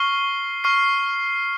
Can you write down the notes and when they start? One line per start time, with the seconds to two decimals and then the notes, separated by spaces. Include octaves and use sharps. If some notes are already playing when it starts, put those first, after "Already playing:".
Already playing: C#6 F6 C7 G7
0.64 C#6 F6 C7 G7